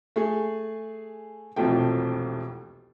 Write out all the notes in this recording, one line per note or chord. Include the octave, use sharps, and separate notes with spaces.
A3 G#4
E1 C2 F2 F3 A3 G5